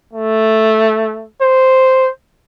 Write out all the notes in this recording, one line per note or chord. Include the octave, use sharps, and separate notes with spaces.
A3
C5